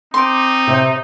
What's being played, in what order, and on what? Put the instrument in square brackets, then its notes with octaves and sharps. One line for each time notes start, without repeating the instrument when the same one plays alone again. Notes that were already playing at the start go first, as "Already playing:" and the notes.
[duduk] C4 [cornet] D#4 [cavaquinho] C6 D6
[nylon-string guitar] C3